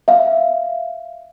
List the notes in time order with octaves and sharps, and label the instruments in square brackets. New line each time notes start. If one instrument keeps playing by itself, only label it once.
[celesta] E5 F5